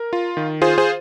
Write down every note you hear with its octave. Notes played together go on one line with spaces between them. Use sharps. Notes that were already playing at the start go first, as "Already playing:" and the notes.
Already playing: A#4
F4
D#3
F4 G#4 C5
G#4 C5